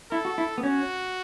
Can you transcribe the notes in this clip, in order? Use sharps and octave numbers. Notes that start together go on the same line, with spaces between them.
E4 A4
F#4
E4
B3
C#4 F#4